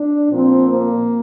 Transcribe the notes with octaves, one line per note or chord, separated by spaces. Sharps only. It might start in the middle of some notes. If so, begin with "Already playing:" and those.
Already playing: D4
A#2 F3 C4
A#3